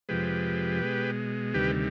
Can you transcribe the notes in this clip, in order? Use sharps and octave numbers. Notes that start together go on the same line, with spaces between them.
F2 C3 F3 G#3 G4 B4
B2 G#3
D2 C3 D#3 G3 G4 B4